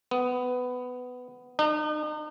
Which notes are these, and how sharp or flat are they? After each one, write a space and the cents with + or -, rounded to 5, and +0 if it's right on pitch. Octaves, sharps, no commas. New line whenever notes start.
B3 +15
D#4 -40